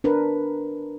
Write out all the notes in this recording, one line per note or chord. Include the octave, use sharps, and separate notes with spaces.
D4 A#4 B4